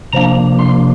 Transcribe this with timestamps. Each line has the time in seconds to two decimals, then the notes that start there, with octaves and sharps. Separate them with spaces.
0.13 C3 F3 A#3 D4 A#5
0.59 C6